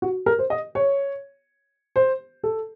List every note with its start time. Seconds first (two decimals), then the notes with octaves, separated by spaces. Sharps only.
0.02 F#4
0.26 A#4
0.39 C5
0.50 D#5
0.75 C#5
1.96 C5
2.43 A4